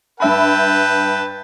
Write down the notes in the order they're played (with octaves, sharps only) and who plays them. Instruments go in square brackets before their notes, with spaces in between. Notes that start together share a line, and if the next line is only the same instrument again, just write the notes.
[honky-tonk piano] G2 E5 B5 [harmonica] B4 G5 A5